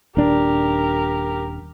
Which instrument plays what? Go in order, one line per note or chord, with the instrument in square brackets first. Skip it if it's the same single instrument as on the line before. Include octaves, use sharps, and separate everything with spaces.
[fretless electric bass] D#1 D4 [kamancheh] G4 A#4